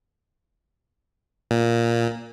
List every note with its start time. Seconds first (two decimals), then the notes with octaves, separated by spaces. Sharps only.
1.51 A#2